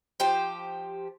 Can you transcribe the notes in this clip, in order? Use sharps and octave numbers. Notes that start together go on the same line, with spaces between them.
F3 G4 C5